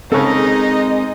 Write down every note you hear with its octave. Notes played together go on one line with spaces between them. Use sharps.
C#3 G#3 C4 D#4 A4 A#4 D#5